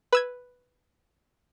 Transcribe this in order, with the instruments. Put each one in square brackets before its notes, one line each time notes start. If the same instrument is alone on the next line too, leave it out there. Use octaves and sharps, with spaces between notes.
[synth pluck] B4 E6 G#6